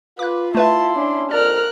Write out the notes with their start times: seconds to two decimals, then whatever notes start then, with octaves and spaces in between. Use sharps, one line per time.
0.19 F4 B4 D6 F#6
0.55 A3 E4 B4 E5 A5 C6
0.95 C#4 D4
1.31 F2 A#4 D5 F6 F#6